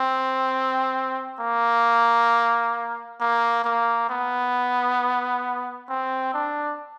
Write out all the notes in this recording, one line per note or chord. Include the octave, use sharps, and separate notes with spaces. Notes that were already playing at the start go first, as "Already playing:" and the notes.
Already playing: C4
A#3
A#3
A#3
B3
C4
D4